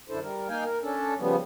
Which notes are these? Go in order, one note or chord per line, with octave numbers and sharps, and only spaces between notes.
F#2 D3 D4 E4 A4 C5
G3 A#4
A#3 D#4 F5 G5 G#5
A#4
C#4 D4 A4
C#3 F3 G3 B3